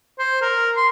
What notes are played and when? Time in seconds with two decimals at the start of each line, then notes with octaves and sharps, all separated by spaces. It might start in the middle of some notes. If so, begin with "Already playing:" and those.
0.19 C5
0.42 A#4
0.76 C6